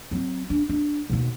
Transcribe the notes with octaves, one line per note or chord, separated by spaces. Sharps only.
F#3 C4
D4
D4
D#2 B2